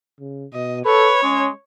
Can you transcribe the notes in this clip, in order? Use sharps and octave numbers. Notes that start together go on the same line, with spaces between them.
C#3
B2 D#5
A4 B4 C#5
G#3 C#4